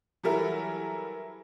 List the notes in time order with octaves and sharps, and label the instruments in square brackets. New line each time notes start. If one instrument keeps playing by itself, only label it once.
[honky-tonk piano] E3 F#3 G3 E4 A4 A#4